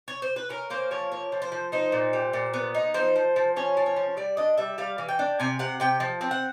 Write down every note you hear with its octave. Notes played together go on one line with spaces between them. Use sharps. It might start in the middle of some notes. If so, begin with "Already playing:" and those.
C#5
C5
B4
C#4 A#4
A#3 C5
F3 C#5
A#3 C#5
F3
C5
F3
D#4 C5
A#2
G3
A#2
B3
D#4
F3 C5
F3
F3
C#4 C#5
F3
C#5
F3
G3 D5
D4 D#5
G3 E5
G3 F5
E3
G5
D4
C3 G#5
C3 F#5
C3 G5
F3
C4
F#5